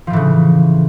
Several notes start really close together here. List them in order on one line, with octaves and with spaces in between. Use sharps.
F3 A2 E3 C#3